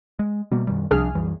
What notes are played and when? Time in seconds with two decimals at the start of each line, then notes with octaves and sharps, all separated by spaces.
0.19 G#3
0.52 B2 G3 A#3
0.67 F#2 D#3 G3
0.91 C2 F3 D4 G#4 F6
1.15 F#2 E3 G3